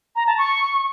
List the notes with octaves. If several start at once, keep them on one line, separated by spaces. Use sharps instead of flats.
A#5
A5
C#6